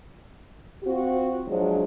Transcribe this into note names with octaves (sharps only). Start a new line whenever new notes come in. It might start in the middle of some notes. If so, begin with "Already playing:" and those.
C4 F4 F#4
F3 F#3 G#3 D4